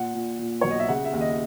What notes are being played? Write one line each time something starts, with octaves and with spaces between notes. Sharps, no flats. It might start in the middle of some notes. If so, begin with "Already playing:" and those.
Already playing: A#2 F#5
A#2
A#2
B1 C#5
D#5
E5
C#3 F#5
E5
D#2
D#5